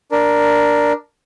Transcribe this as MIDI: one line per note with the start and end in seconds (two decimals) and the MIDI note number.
0.12 0.93 62
0.12 0.93 70